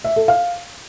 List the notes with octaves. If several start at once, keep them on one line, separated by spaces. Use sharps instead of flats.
E5
A4
F5